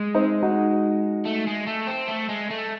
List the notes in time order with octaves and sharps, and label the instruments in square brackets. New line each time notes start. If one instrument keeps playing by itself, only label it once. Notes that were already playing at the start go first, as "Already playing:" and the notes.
Already playing: [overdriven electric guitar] G#3
[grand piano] C4 D#4
D#4 F#4
[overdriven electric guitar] A3
G#3
A3
C4
A3
G#3
A3